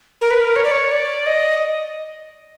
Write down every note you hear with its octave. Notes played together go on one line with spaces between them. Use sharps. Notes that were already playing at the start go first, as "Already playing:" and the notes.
A#4
B4
A#4
C#5
D5
C#5
D5
D#5